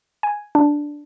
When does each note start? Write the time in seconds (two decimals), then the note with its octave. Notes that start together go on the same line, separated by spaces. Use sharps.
0.23 G#5
0.55 D4